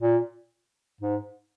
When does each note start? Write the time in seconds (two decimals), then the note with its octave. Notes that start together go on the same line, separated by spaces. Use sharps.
0.02 A#2
1.01 G#2